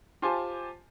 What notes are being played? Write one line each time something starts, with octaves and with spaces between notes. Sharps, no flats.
F4 G4 C5 G#5 A5